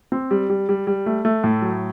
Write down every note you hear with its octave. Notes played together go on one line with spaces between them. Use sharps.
C4
G3
G3
G3
G3
A3
A3
A2
F#3